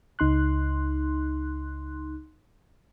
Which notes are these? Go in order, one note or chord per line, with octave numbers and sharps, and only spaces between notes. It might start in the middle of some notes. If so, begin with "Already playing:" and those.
C#2 D#4 C6 F#6